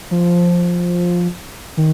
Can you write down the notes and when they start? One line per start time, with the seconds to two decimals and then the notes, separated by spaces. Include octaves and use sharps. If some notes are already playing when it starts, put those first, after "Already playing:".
0.11 F3
1.77 D#3